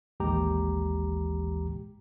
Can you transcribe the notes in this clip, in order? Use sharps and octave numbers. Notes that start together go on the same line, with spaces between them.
A1 D#2 E3 G#3 G4 A#5